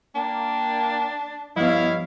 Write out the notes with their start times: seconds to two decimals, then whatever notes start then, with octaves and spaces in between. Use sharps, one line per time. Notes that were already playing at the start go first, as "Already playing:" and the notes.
0.15 A#3 D4 G5
1.56 G2 F3 B3 E4 C#5 D#5 F5